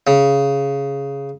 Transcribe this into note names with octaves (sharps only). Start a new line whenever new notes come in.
C#3